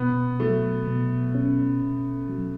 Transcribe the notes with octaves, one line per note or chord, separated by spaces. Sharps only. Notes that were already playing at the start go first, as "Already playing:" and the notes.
Already playing: B2 B3
F#3 A3
B2
C#4
B2
F#3